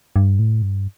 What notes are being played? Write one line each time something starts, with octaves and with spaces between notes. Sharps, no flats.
G2
A2
G2